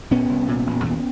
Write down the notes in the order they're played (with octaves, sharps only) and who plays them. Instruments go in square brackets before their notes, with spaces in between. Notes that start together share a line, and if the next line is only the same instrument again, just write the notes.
[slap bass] A#2 B3 C#4
C2
A#2
E1
D#2